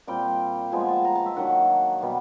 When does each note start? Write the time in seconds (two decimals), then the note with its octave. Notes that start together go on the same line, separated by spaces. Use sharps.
0.07 A#2 G3 C4 G5
0.72 A#2 F3 G#3 B3 G#5
0.88 A5
1.05 A#5
1.16 A5
1.26 E5
1.36 D#3 F#3 A#3 D4 F#5
2.01 B2 G3 B3